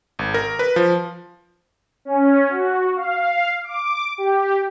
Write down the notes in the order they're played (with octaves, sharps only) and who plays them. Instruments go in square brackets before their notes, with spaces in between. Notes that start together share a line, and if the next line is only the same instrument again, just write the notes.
[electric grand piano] G#1
A#4
B4
F3
[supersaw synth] C#4
F#4
F5
D6
G4